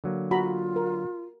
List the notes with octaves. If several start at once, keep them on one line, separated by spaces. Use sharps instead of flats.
D3 F#3 A#3
F4 F#4 A#5 B5
A#4